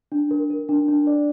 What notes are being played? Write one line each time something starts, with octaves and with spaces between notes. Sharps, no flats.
D4
A#4
A#4
D4
D4
D5